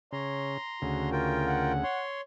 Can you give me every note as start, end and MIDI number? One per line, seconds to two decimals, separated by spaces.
0.12 0.57 49
0.12 0.58 73
0.12 1.10 82
0.12 1.10 84
0.82 1.84 38
0.82 1.84 49
0.82 1.39 66
1.12 1.72 65
1.12 1.72 70
1.12 1.72 79
1.46 2.04 78
1.83 2.21 73
1.83 2.21 84